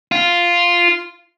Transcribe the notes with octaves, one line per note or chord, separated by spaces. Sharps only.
F4